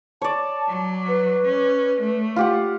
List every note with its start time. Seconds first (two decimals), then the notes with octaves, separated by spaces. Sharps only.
0.22 C#5 D5 A5
0.68 F#3
1.08 B4
1.47 C#4
2.00 A3
2.36 F4 G4 F#5